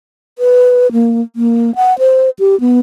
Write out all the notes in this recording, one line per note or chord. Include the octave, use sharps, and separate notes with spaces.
B4
A#3
A#3
F#5
C5
G4
B3